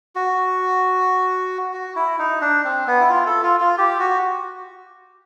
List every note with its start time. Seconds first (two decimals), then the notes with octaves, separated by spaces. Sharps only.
0.16 F#4
1.73 F#4
1.96 E4
2.19 D#4
2.41 D4
2.64 C4
2.87 B3
3.01 E4
3.09 F4
3.26 A4
3.43 F4
3.60 F4
3.78 G4
3.99 F#4